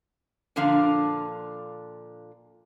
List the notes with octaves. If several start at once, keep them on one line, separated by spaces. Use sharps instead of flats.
A#2 D3 F3 D4 F5